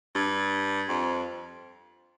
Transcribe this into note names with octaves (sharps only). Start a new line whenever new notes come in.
G2
F2